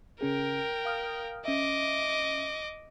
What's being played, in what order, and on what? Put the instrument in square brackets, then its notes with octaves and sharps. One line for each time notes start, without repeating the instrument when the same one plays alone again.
[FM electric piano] C#3 C#4 G#4 [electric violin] A#4 G5
[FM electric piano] F5 D#6 F6
[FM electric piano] C#4 E5 [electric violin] D#5 D6